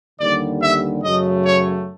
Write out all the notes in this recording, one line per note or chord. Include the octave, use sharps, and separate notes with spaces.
D#2 D3 G3 D5
E5
F#2 C#3 F#3 A3 D#5
C#5